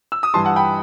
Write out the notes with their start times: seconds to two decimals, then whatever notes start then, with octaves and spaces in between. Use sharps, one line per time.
0.12 E6
0.23 D#6
0.33 G2 E3 G3 A5 C6
0.45 F#5 A5
0.56 G5 B5